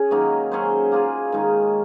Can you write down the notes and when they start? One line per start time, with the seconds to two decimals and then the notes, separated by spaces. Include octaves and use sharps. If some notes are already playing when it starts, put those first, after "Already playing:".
Already playing: C#4 G#4
0.11 D#3 F#3 A#3 D#4
0.52 F#3 C#4 G#4 C5
0.92 A#3 F4 G#4
1.32 D#3 G#3 D#4